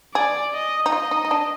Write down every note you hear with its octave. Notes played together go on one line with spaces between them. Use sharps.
G#4 D5
D#5
D#4
F4 D#5
D#4
D#4
D4